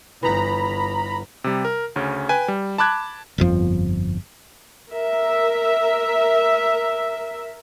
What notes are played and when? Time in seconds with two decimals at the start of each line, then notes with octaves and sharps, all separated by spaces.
0.23 G1 E3 D#4 F#5 A#5 B5
1.44 C3 G3
1.65 A#4
1.96 D2 C#3 C#4
2.29 B4 G5 G#5
2.48 G3
2.78 A5 B5 D6 F#6 G#6
3.38 G1 F2 F3
4.90 A#4 E5